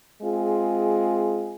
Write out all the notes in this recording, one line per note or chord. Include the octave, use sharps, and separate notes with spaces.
G#3 C4 F4 G#4